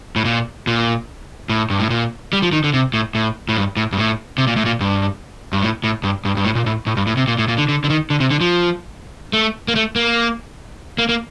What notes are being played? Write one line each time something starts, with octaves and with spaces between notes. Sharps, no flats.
A2
A#2
A#2
A2
G2
A2
A#2
G3
F3
D#3
D3
C3
A2
A2
A2
G2
A2
G2
A2
C3
A#2
A2
A#2
G2
G2
A2
A2
G2
G2
G2
A2
A#2
A2
A2
G2
A2
C3
A#2
A2
A#2
D3
D3
D3
D#3
D3
C3
D3
F3
A3
A#3
A3
A#3
A#3
A#3